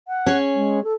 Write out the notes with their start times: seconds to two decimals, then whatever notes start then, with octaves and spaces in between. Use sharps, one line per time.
0.08 F#5
0.26 C#4 G#4 C#5
0.55 G#3
0.84 A4